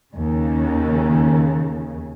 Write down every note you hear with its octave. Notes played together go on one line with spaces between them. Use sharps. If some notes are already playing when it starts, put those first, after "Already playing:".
D#2 C#3